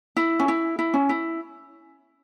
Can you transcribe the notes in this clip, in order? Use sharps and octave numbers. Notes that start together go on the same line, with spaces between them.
E4
C#4
E4
E4
C#4
E4